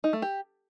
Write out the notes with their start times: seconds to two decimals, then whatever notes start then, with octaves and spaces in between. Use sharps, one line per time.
0.04 D#4
0.13 A3
0.22 G4